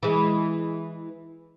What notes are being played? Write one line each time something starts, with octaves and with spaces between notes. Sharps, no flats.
E3 G#3